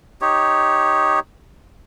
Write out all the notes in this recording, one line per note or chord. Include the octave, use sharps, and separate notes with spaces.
D#4 G4 C#5